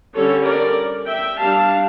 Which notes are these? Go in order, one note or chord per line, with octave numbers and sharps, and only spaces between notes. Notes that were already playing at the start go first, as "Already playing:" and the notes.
D3 G3 C#4 A4 C#5
A#4 D5
E5 G5
G3 D4 F5 A5